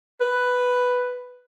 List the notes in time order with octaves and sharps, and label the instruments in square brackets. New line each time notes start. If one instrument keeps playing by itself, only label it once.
[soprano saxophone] B4